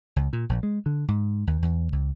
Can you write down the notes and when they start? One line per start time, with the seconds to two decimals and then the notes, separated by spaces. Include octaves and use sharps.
0.16 C#2
0.33 A#2
0.49 A#1
0.63 G#3
0.86 D3
1.08 G#2
1.47 D#2
1.62 E2
1.92 C#2